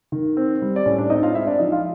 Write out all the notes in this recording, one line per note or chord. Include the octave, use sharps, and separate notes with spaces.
D#3
C4
G3
D5
A2 C#4 C#5
D4 D5
C4 D#4 D#5
F4 F5
G#3 E4 E5
D4 D5
F3 D#4 D#5
F4 F5